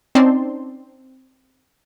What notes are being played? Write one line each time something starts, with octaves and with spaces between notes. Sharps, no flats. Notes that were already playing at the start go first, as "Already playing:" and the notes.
C4 C#4 D#4 D5 A5 C6